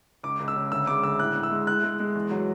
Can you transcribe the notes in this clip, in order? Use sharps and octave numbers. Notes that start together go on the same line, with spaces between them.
C#2 D6
C#2
E6
C#3
D2 E6
G#3 D6
D2 E6
A2 F#6
A2
E6
G#3
A2 F#6
G#3
G#3
E2
F#3